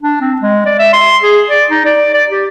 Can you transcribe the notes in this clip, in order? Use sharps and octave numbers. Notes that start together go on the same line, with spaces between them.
D4
C4
G#3
D5
E5
C6
G#4
D5
D#4
D5
D5
G4